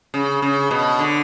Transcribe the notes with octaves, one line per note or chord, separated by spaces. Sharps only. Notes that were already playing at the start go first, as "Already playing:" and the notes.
C#3
C#3
B2
D3